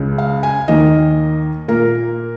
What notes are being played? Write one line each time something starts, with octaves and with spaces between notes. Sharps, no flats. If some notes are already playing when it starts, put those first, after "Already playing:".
Already playing: C#2 C#3 G#3
F5
G#5
D#2 D#3 A#3 D#5
A#2 A#3 A#4